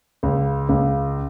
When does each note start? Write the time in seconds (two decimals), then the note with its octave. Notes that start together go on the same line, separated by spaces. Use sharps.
0.23 C#2
0.69 C#2